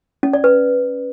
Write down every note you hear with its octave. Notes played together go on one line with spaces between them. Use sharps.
C#4
D5
B4